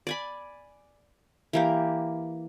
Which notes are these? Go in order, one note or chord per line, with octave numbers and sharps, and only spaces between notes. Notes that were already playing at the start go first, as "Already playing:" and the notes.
D5 G#5 B5
E3 A#3 G4